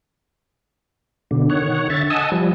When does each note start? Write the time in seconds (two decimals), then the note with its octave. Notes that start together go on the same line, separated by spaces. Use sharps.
1.31 B2 D3
1.50 D#3 C#5 F#5
1.90 D3 E5 A6
2.10 D#5 F#5 G#5 A5 D#6 E6
2.32 F3 G3